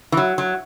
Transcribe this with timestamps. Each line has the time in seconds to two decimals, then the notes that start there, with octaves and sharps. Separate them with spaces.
0.12 E3
0.17 F#3
0.38 F#3